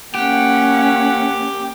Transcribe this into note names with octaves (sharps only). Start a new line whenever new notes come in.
A#3 C#4 G4 F#5